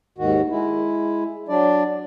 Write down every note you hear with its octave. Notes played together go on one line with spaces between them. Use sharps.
D#2 G#2 D#3 F#4
G#3 E4
F#3 D4 D5